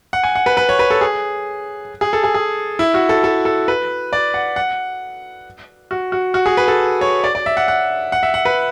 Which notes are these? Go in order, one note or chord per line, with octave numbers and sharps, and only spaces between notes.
F#5
G#5
F#5
B4
B4
C#5
B4
A4
G#4
G#4
A4
G#4
G#4
E4
F#4
A4
A4
A4
B4
D5
F#5
F#5
F#4
F#4
F#4
G#4
B4
A4
C#5
D5
D5
E5
F#5
F#5
F#5
E5
F#5
B4